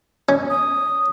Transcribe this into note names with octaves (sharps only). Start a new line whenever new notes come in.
C#4
D#6